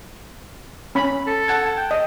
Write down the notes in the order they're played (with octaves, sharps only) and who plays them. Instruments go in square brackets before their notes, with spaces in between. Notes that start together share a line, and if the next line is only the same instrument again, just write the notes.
[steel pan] C#4 B5
[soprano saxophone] A4
[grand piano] F#5 A5 G#6
[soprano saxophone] G5
[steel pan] D#5